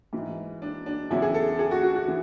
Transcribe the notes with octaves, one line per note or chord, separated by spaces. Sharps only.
G#2 E3
D4
D4
E2 C#3 F#3 E4
G#4
A4
G#4
F#4
F#4
F#4
E3